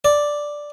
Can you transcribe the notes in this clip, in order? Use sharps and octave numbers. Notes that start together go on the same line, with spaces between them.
D5